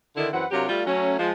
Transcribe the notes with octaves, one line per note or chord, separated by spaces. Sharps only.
D3 D#3 E4
F#2 E3 C4 B4 F#5
C3 F#3 D4 F4 G4 A#4
G3 A3 F4
F#3 A3 C#4
F3 G#3